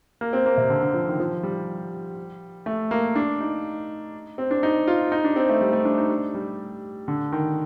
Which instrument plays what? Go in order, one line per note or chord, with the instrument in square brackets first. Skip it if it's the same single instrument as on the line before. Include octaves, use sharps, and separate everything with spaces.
[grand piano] A#3
C4
A#3
C3
D3
D3
F3
D#3
F3
G3
A3
A#3
D4
D#4
C4
D4
D#4
F4
D#4
D4
C4
A3
G3
A3
D4
D#4
D4
G3
D3
D#3